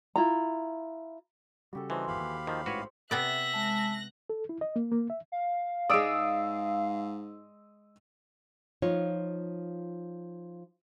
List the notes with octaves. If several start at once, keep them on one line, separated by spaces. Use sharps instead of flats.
E4 F4 A#5
C#3 G3 F#4 G4 A4
E3 D4 F#4 C5 D#5
G#1 E2 G4 F5 B5
D#2
D#3 F3
A1 G#2 E3 F#4 B4 C#5
C3 B3 D5 E5 F#6 A#6
G#3 A5
A4
E4
D#5
A#3
A#3
E5
F5
G#2 G#3 D5 D#6 E6 D7
F3 D#4 F4 C#5